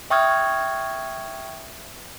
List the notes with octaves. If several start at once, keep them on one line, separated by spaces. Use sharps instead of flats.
E5 G5 C#6 D#6 F6 G#6